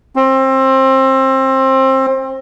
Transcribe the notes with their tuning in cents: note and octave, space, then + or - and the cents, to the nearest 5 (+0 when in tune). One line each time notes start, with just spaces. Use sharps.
C4 +25